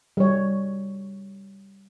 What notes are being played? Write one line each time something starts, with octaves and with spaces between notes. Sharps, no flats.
G3 C#5